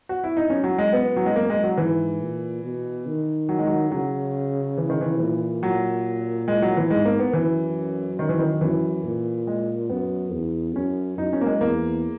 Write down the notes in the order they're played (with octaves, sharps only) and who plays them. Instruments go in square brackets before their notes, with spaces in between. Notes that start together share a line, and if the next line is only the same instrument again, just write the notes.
[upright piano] F#4
E4
D#4
[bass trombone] F#2 [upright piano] C#4
[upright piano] F#3
G#3
B3
F#3
G#3
[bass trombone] F#2 [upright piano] A#3
[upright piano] G#3
F#3
[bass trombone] G#2 [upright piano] E3
[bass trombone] A#2
B2
D#3
[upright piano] F#3
G#3
F#3
[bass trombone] C#3 [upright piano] F#3
[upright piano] E3
D#3
E3
[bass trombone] A#2 [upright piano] E3
[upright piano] F#3
G#3
F#3
E3
[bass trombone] G#2 [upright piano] G#3
[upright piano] A#3
B3
[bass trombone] F#2 [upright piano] E3
[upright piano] D#3
E3
D#3
[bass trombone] F#2 [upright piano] E3
[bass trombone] A#2
[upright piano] G#3
[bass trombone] F#2 [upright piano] B3
[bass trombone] E2
[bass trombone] F#2 [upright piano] C#4
[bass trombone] F#2 [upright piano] D#4
[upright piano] C#4
A#3
G#3
[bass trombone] E2 [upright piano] A#3